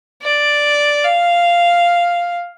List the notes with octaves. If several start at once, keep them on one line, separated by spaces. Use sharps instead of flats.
D5
F5